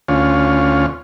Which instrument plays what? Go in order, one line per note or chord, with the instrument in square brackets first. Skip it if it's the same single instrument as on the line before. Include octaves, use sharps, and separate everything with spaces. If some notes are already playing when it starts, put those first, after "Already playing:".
[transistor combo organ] D2 C#4 F4